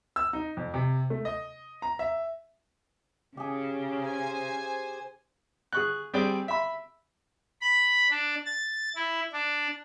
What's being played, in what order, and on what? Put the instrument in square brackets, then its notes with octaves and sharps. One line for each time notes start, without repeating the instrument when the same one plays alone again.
[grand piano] E6
D#4
F2
C3
A3
D#5
A#5
E5
[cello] C#3 [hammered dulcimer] G4 G#4
[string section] C5 G#5
[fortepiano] G#4 C#6 F#6
G3 C4 G4 G#4 D5
E5 B5
[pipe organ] B5
D4
A6
E4
D4